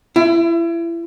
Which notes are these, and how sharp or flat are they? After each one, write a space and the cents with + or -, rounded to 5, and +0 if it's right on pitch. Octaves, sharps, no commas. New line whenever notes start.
E4 +30